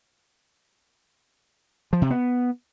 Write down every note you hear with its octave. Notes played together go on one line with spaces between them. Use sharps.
F3
C3
B3